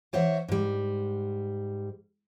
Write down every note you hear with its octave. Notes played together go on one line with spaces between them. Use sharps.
E3 C5 C#5 E5 F#5
G#2 G3